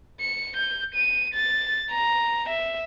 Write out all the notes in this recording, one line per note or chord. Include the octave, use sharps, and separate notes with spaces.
C#7
G6
D#7
A6
A#5
E5